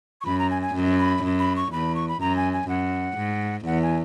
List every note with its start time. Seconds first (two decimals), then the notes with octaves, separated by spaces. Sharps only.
0.21 C#6
0.26 F#2 B5
0.39 A#5
0.50 G#5
0.62 G#5
0.75 F#2
0.99 B5
1.24 F#2
1.39 B5
1.56 C#6
1.72 E2 B5
1.95 C#6
2.08 B5
2.21 F#2 A#5
2.37 G#5
2.53 G#5
2.69 F#2 F#5
3.18 G#2
3.66 E2 F#5
3.82 G#5